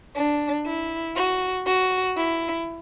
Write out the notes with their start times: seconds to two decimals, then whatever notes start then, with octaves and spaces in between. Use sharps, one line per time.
0.16 D4
0.66 E4
1.16 F#4
1.66 F#4
2.17 E4